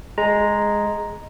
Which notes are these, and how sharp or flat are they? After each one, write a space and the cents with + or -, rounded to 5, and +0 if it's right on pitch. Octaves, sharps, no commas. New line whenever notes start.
G#3 +0 A#5 +0